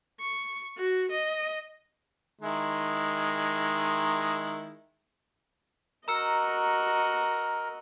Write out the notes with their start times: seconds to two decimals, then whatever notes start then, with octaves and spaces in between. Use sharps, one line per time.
0.20 C#6
0.77 F#4
1.10 D#5
2.41 D#3 G#3 E4
6.08 F#4 A#4 D#5 A#5 E6 C#7